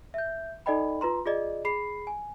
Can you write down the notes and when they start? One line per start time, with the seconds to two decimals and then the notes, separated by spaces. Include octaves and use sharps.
0.14 E5 G6
0.66 D#4 A4 D5 D#5 G5 B5
1.01 F4 B4 A#5 C6
1.26 F4 G#4 D5 D#5
1.65 G#4 B5 C7
2.07 G#5